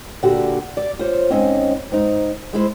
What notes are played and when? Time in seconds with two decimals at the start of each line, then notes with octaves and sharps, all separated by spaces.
0.23 A#2 D3 F#4 G4
0.77 D5
0.99 F4 C5 C#5
1.30 G#2 C4 C#4 D#5
1.92 G#2 D#4
2.53 G#3 E4 C5